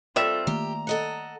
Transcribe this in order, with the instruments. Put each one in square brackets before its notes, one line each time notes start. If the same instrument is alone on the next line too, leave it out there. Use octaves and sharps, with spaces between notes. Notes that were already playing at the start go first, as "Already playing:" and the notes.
[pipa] G3 E5 [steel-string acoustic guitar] C4 [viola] F4 A4
[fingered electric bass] D#3 A3 A#3 [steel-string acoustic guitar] G4 [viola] A#5
[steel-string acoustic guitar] A4 D#5 F#5